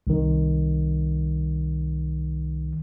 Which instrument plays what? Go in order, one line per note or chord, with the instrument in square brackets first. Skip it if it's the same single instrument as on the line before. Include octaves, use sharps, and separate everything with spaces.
[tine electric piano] C2 D#3